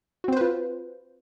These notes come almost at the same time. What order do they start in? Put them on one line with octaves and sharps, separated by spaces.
F#4 C4 C5 B4 F4